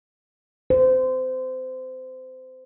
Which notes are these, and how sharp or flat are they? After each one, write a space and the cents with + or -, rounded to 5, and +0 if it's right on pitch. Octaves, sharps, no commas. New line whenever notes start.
C5 -25